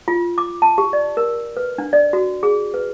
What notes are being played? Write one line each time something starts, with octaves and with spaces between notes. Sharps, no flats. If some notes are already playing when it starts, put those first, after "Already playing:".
F4
D6
A5
G4
D5
A#4
B4
D4
D5
F#4
G#4
B4